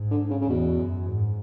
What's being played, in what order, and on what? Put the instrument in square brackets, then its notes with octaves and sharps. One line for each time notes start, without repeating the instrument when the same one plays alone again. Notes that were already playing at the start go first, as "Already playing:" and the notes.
Already playing: [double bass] G#2
[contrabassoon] D3
C#3
C#3
[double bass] E2 [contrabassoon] B2
[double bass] F#2
G#2